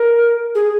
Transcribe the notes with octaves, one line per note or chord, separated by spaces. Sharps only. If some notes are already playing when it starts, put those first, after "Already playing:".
Already playing: A#4
G#4